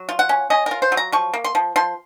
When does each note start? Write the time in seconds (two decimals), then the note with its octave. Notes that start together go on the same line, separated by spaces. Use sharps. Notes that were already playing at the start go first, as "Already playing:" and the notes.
Already playing: F#3
0.09 F4
0.19 F#5
0.29 C#4
0.50 C#4 D#5
0.66 F4 A#4
0.82 C5
0.92 F#3
0.97 A#5
1.12 F3 C#6
1.34 A#3
1.44 C6
1.55 F3
1.76 F3 C6